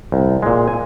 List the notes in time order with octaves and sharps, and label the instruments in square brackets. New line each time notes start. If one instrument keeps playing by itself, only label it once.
[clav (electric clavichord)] C2
A#2 G#3
G#5